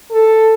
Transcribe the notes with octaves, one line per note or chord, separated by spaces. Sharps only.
A4